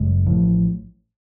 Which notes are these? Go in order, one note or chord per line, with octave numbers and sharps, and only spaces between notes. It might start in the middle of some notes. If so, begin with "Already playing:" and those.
Already playing: F#1 F#2 C#3 G#3
A1 A2 F3